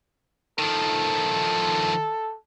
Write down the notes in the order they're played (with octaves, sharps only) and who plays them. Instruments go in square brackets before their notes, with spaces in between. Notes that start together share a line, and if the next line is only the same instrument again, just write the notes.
[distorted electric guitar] D#3 F3 [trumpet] A4